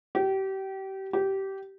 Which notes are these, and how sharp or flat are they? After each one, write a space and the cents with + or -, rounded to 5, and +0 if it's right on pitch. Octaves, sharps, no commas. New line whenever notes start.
G4 -30
G4 -20